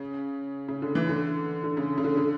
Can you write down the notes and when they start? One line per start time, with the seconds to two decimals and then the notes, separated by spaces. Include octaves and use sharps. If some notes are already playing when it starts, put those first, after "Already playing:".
Already playing: C#3
0.68 C#3
0.82 D3
0.95 E3
1.09 D3
1.64 D3
1.77 C#3
1.98 C#3
2.04 D3
2.17 D3